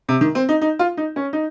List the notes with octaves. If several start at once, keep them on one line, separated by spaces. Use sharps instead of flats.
C3
D#3
C4
D#4
D#4
F4
D#4
C#4
D#4